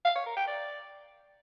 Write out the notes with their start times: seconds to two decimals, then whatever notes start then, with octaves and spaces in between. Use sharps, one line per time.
0.05 F5
0.16 C#5
0.26 A#4
0.37 G5
0.47 D5